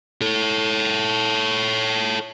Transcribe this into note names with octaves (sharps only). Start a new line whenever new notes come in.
A4 C#5